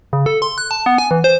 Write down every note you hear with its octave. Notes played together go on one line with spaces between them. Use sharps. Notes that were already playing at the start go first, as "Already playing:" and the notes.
C#3
A4
C6
F#6
A5
B3
G#5
E3
C5